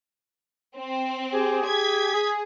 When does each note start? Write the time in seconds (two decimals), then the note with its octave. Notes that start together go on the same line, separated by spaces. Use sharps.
0.78 C4
1.32 G4 G#4
1.66 G#6 B6
2.13 G#4